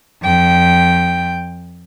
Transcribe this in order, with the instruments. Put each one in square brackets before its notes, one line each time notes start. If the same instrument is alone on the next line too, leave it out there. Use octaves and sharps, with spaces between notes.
[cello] F2 G5